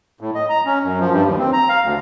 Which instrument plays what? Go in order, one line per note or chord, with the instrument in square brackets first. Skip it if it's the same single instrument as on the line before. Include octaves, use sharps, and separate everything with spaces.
[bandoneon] A2
D#5
A#5
C#4
F#2
F3
G2
D#2
C4
A#5
F5
D2